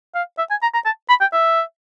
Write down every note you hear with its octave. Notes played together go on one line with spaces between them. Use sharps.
F5
E5
G#5
A#5
A#5
A5
B5
G5
E5